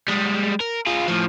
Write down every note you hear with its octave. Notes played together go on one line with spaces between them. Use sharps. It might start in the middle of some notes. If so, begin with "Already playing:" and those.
G3 G#3
A#4
F4 G#4
A2 F3